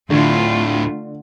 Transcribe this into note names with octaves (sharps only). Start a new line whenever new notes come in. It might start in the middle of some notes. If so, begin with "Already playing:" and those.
D2 A2 D3 A3 F4